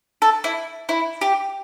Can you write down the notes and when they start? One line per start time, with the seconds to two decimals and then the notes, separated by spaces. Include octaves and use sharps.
0.22 A4
0.44 E4
0.89 E4
1.21 G4